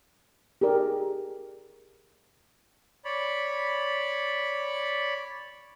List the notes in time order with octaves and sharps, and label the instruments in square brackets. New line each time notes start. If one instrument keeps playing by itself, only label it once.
[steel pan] G4 G#4 A#4 D5
[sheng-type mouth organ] C#5 D5 B5